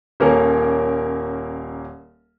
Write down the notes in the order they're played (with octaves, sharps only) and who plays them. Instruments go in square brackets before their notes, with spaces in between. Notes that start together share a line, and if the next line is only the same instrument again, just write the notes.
[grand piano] D#1 A#3 C#4 A4 A#4